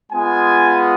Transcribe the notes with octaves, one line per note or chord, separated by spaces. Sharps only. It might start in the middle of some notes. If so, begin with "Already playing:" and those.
G#3 B3 F4 G#5